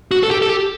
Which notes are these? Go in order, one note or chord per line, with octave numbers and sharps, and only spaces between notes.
F#4
A4
G4
A4
G4